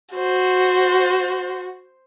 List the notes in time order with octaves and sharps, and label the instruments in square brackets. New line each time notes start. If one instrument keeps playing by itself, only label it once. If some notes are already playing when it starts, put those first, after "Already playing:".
[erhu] F#4 [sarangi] C5